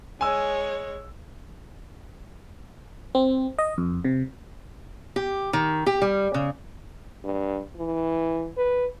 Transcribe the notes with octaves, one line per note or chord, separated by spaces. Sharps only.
G#3 C#5 G#5 E6
C4
D#5
F2
C3
G4
D#3
G4
G3
C#3
G2
E3
B4